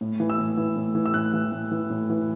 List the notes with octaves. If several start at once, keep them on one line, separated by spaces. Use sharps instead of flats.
A2
E3
E6
A2
E3
A2
E3
E6
A2 F#6
E3
A2
E3
A2
E3